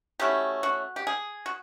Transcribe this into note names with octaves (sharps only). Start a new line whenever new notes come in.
F#3 A3 C#4 E4 G4
F#4
G4
G#4
F#4